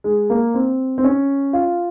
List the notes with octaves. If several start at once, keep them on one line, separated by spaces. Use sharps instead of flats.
G#3
A#3
C4
C4
C#4
F4